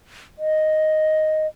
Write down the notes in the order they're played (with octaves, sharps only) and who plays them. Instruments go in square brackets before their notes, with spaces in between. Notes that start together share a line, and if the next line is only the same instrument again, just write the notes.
[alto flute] D#5